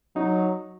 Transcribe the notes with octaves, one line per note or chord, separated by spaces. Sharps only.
F#3 D#4